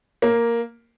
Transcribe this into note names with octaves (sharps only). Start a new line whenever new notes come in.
A#3